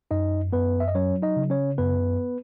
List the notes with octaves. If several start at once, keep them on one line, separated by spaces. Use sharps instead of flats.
F#2 D#4 D#5
F#2 B3 B4
E5
D#5
F#3 C#4 C#5
D#4 D#5
C#3
C#4 C#5
F#2 B3 B4